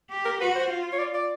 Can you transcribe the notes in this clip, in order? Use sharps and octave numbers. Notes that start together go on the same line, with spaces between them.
G4
A#4
F#4 B4
C5
F4
C#5
D5
D5